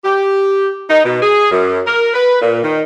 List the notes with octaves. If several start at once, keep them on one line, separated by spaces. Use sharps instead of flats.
G4
D#4
B2
G#4
F#2
A#4
B4
A#2
D#3